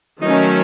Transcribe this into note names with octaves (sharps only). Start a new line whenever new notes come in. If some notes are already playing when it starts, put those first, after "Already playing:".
D#3 F#3 A3 C#4 D#4